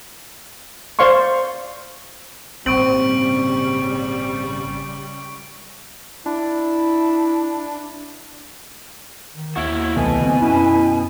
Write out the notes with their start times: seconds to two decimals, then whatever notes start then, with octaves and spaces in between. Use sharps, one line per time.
0.99 C5 D5 F5 C6 C#6
2.66 G#1 A#2 C#3 G3 C4 C#6 D7 F#7
6.26 D4 E4
9.35 D#3
9.56 D#2 E4 F#4
9.96 C2 B2 E3 A3 G#5
10.21 D3 F#3 C4
10.41 F#2 C#4 E4